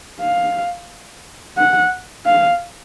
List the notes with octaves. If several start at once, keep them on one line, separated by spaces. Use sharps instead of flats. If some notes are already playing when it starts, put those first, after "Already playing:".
F5
F#5
F5